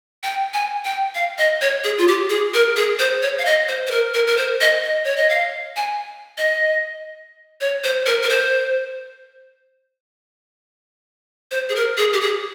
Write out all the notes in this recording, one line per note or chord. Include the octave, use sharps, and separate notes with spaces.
G5
G#5
G5
F5
D#5
C#5
G#4
F4
G4
G#4
A#4
G#4
C5
C#5
F5
D#5
C5
C5
A#4
A#4
A#4
C5
D#5
D#5
C#5
D#5
F5
G#5
D#5
C#5
C5
A#4
A#4
C5
C5
G#4
A#4
G#4
G4
G#4